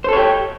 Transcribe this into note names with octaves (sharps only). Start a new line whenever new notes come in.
G4 A4 C5 C#5